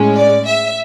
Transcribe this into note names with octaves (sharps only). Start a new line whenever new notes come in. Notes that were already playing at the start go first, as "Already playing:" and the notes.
Already playing: A2 G#3 C#4
D5
E5